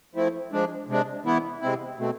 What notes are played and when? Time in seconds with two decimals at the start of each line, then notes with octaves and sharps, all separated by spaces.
0.15 F3 A3 C4 E4
0.52 F3 G#3 D4
0.88 C3 G#3 D4
1.25 E3 B3 E4
1.61 C3 G#3 C4 E4
1.98 B2 A3 C4